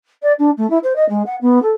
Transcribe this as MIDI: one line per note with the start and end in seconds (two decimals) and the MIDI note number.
0.22 0.32 74
0.39 0.50 62
0.57 0.68 57
0.70 0.78 64
0.83 0.96 72
0.96 1.07 75
1.09 1.22 56
1.26 1.35 78
1.41 1.61 59
1.62 1.71 69